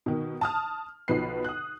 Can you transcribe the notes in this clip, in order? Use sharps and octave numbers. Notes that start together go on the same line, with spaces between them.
B2 D#3
A5 D#6 F6
B1 B2 F3 B4 C7
D#6 F#6